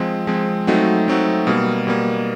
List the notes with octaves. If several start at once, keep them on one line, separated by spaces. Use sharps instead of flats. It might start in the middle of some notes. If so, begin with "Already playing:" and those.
Already playing: F3 G#3 C4
F3 G#3 C4
F#3 A3 C4 D#4 F#4
F#3 A3 C4 D#4 F#4
B2 G3 A#3
B2 G3 A#3